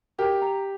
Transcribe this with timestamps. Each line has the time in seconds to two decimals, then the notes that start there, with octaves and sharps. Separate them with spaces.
0.18 G4 A#4
0.42 A#5